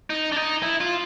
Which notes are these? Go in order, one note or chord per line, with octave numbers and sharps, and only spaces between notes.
D#4
D4
D#4
E4
F4